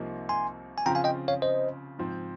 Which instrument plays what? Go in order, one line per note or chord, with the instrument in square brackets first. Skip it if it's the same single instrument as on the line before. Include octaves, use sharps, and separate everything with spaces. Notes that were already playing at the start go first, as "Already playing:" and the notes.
Already playing: [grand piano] C2 C3 F3 A#3 D#4
[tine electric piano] G#5 C6
G#5
[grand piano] C#3 F3 C4 F4 [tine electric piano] G5 A#5
[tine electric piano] F5 G#5
D#5 G5
C#5 F5
C5 D#5
[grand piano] G#2 F3 C4